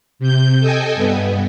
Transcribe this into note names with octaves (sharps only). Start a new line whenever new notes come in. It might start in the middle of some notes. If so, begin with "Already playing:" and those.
C3 G6
A4 D#5 G5 G#5
G2 B3